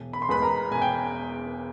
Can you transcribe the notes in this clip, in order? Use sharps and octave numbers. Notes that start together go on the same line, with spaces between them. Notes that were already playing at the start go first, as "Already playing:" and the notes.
Already playing: E1
B5
C6
E2 B2 G#3 B4 B5
A#4 A#5
E1 G#5
G5